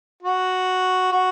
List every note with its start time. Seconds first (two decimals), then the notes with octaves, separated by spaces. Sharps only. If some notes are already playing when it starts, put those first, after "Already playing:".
0.23 F#4
1.12 F#4